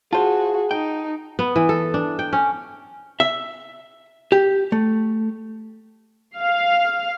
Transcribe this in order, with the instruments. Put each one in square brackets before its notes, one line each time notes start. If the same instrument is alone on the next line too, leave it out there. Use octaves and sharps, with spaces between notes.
[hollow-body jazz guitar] F4 C5 [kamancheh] F#4 [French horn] G#4 [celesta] A5
[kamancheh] D#4 [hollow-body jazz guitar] G5
[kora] B3
E3
A4
D4
G5
C#4
[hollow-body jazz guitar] E5
G4
A3
[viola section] F5